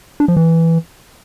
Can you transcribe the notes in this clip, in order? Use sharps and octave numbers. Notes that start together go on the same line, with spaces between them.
D4
F3
E3